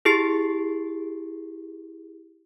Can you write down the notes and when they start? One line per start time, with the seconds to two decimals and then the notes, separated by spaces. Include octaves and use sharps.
0.05 E4 G4 G#4 A6 C7